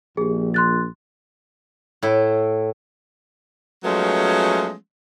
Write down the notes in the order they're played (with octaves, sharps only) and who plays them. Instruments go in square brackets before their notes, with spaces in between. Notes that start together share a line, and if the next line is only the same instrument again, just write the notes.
[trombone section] A#1 [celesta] G4 G#4
[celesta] C6 F#6 A6
[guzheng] A2 E4
[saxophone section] F3 F#3 G#3 A3 B3 C#4